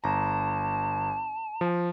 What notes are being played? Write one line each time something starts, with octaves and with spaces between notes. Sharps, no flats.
G1 A5 A#5
F3